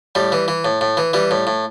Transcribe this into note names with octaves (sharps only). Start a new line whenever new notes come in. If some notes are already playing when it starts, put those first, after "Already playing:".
A2 G3
E3
E3
A2
A2
E3
E3 G3
A2
A2